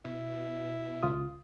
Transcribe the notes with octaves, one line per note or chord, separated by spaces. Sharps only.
B2 E4
C#2 F4 D#6